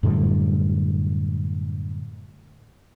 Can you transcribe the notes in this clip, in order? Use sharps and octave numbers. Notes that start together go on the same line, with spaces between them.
F#2 A2 D3 G3